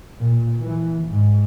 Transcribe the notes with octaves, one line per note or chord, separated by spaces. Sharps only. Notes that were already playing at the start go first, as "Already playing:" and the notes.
A#2
E3
G#2